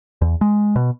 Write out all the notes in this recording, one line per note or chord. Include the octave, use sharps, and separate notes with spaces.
E2
G#3
B2